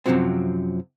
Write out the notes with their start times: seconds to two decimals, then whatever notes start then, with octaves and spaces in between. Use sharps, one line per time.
0.06 F#2 C3 D#3 F3 F#3 C4